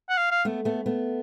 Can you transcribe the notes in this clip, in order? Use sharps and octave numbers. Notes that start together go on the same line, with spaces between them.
F#5
F5
F5
A3 B3
A3 B3
A3 B3